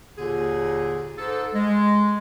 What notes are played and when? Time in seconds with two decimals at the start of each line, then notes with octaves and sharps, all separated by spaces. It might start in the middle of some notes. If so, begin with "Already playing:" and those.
0.17 D#2 A#2 D3 G#4
1.17 G#2 A4
1.54 G#3